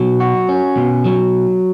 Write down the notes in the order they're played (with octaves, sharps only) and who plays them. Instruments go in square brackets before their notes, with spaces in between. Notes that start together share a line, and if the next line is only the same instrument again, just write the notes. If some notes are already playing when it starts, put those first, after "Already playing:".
Already playing: [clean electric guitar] B2 F#3
F#4
C#4
B2
F#3